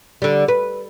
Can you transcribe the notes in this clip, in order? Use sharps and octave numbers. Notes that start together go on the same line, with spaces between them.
D3 G3
B4